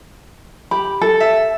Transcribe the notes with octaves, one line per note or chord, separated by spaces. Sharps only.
G4 B5
A4
E5